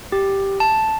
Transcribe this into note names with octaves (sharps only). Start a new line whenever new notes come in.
G4
A5